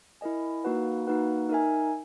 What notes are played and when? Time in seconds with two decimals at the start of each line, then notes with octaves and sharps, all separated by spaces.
0.21 E4 A#4 D#5 G#5
0.64 A#3 D#4 F#4 B4 F#5
1.07 A#3 D#4 F#4 B4 F#5
1.49 D#4 A#4 E5 G#5